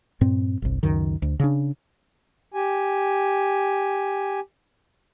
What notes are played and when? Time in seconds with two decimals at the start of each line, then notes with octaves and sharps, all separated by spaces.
0.21 G2 A#2 C4
0.62 G1 C2
0.83 C#2 F#2 D#3
1.22 D2
1.40 C#3 D4
2.54 G4 G#5